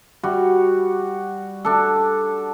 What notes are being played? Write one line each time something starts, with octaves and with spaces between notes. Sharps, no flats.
G3 F#4
D4 A4